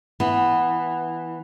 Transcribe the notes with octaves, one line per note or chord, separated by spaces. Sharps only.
E3 B3